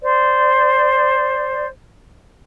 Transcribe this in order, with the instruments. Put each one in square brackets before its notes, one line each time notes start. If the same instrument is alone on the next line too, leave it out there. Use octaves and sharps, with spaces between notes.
[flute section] C5 D5